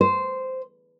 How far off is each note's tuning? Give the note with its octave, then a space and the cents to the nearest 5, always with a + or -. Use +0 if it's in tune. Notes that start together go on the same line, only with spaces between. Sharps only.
C5 -10